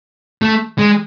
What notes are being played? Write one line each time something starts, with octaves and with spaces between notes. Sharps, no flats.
A3
G#3